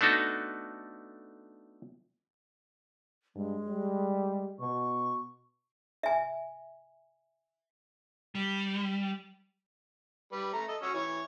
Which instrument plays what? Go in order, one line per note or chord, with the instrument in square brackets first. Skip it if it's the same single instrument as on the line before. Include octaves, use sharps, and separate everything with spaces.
[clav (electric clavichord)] A3 B3 D4 D#4 F#4 A4
[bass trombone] G2 [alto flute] G#3
[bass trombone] G3
[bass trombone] B2 [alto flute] C#6
[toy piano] E5 G#5
[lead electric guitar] G3
[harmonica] G3 B4
A3 A#5
A4 D#5
C#4 F#4 E6
E3 C#5